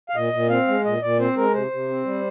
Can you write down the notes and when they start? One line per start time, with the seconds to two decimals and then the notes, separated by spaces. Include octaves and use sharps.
0.09 F5
0.15 A#2 D#5
0.33 A#2
0.50 C4 F5
0.68 G#3
0.85 A#2 D#5
1.02 A#2 D5
1.19 C4 C5
1.37 G#3 A#4
1.54 C3 C5
1.71 C3
1.89 C4
2.06 G3